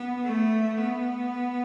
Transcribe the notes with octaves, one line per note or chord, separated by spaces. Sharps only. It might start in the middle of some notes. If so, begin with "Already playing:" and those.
Already playing: B3
A3
B3